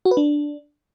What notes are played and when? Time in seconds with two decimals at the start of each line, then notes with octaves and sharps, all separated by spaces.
0.05 F#4
0.11 B4
0.17 D4